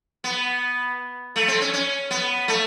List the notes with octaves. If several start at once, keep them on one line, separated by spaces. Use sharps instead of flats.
B3
A3
C4
C#4
C#4
B3
A3